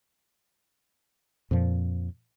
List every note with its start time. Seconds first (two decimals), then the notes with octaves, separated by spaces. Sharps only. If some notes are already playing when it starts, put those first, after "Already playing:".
1.51 F2 A#2 F3